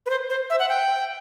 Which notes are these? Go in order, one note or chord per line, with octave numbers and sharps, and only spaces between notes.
B4
C5
C5
E5
F#5
G5